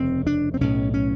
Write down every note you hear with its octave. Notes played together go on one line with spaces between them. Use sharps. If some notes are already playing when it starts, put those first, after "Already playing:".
Already playing: F1 D#2 C#3 C4
D4
C4
B1 A2 C#4
C#4